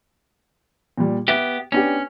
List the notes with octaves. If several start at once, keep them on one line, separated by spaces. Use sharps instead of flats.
A#2 G3
B3 G4 E5
B3 C#4 D4 G4